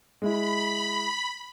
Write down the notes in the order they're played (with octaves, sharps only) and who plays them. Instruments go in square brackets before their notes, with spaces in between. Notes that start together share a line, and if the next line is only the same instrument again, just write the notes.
[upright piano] G#3 E4 [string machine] B5